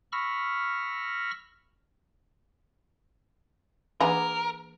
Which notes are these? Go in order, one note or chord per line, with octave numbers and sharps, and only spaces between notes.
B5 C#6 E6 F6 A#6
E3 A#3 D4 G#4 A#4 B4 F#5